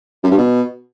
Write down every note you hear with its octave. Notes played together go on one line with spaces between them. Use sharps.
F#2
G2
B2